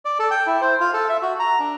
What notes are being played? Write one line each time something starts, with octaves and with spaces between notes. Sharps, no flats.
D5
A4
G5
E4
C5
F4
A4
E5
F#4
A#5
D4